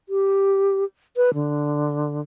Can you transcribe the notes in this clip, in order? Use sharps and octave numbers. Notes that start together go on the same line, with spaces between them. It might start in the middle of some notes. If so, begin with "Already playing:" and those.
G4
B4
D3